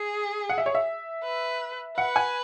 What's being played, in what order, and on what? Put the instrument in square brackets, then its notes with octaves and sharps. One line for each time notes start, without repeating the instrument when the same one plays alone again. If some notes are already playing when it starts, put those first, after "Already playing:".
Already playing: [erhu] G#4
[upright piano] F#5
E5
C#5
E5
[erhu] B4
[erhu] B4 [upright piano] F#5
[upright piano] G#5